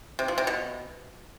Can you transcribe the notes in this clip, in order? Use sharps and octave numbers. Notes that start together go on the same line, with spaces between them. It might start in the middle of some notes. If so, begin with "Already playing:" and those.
C3
F3
C3
B2